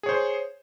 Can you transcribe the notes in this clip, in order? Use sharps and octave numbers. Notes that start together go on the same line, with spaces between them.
G#4 C5 C#5